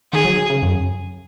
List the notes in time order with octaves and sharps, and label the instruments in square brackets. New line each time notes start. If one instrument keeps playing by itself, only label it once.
[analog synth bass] D#3 [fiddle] G#4
[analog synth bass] F#3
C#3
F#2